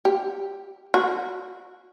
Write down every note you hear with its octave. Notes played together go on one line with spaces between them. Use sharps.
G4
F#4